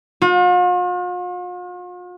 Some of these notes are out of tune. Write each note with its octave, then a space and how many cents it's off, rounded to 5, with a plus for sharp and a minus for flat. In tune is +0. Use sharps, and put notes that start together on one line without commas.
F4 +45